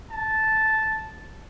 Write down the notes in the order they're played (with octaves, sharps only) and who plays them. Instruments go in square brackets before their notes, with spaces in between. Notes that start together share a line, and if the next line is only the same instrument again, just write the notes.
[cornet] A5